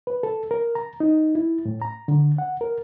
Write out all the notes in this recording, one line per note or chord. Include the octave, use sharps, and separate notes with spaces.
B4
A4
A#4
A#5
D#4
E4
A2
A#5
D3
F#5
A#4